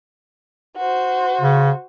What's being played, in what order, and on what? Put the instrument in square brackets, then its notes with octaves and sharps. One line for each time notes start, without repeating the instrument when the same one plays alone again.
[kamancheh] F#4 C5
[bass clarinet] C#3